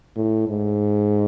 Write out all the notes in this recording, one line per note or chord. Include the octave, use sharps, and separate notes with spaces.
A2
G#2